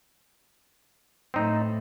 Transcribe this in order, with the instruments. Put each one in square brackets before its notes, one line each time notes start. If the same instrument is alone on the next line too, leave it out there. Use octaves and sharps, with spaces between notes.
[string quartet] A2 [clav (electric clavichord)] C4 D#4